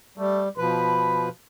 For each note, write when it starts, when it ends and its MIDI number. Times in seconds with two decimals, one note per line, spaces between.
0.18 0.49 55
0.18 0.42 57
0.58 1.29 47
0.58 1.29 53
0.58 1.29 71
0.58 1.27 83